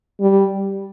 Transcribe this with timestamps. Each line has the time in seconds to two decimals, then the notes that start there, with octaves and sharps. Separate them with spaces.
0.21 G3